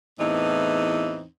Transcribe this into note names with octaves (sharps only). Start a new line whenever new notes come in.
E2 A2 E3 C4 D#4